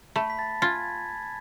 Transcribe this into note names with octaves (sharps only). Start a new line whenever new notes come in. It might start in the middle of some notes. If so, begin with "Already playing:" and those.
A3 B5 B6
B6
A5 A6
F4 G#5 G#6